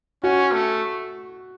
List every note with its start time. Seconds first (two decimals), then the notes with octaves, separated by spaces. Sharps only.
0.23 C#4 F#4
0.52 A3